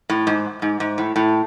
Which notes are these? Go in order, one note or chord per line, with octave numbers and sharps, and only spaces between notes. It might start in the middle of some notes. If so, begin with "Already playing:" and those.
A2
G#2
G#2
G#2
A2
A2